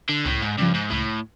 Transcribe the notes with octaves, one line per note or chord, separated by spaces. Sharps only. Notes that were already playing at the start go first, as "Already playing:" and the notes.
D3
C#2 A2
G#2
G2 C#3 F3
G#2
C#2 A2